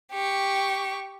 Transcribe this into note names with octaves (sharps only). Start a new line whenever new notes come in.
G4 C#6